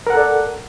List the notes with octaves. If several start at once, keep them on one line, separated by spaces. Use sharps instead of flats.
A4 A#4 D5 F#5